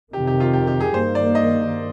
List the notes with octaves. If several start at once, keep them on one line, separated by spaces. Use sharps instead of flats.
F2 C3 D#3 G4
G4
F4
G4
G4
G#4
G2 D#3 A#3 C5
D5
D#5